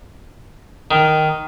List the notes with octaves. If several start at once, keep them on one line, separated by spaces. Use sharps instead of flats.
D#3